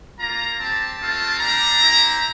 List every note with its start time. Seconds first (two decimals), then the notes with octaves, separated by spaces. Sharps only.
0.19 A#3 F4 A#5
0.59 C4 G4 A5
1.00 A3 C4 F4
1.40 G3 D4 G4 A#5
1.80 C4 E4 G4